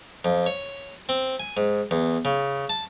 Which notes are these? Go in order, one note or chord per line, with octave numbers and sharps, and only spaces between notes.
F2
C#5
C4
G#5
G#2
E2
C#3
A5